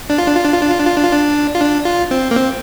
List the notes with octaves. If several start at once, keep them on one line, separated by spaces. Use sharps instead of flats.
D4
F4
D4
F4
D4
F4
D4
F4
D4
F4
D4
F4
D4
F4
D4
F4
C4
A#3
C4